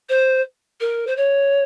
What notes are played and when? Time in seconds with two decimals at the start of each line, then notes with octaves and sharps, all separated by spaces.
0.09 C5
0.81 A#4
1.07 C5
1.17 C#5